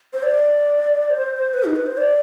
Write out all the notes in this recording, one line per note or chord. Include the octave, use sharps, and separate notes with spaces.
C5
D5
C5
B4
D#4
B4
C5
D5